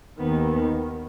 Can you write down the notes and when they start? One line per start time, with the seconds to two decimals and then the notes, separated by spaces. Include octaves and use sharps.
0.19 D#2 D#3 B3
0.52 B3